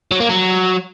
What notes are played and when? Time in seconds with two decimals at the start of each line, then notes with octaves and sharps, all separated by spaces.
0.12 F#3
0.21 A#3
0.30 F#3